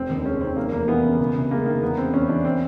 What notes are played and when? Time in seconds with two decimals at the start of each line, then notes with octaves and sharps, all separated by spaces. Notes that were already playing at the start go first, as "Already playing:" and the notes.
Already playing: F1 C4
0.10 D#2
0.19 C4
0.25 G#3 C#4
0.41 D#3 C4
0.56 F1 A#3
0.72 E2 A#3
0.88 E3 B3
1.04 C#3
1.20 C#2
1.36 C3
1.51 G#3 A#3
1.66 D#3 A#3
1.82 E2 B3
1.98 C#3 C4
2.14 E2 C#4
2.29 E3 D4
2.45 C4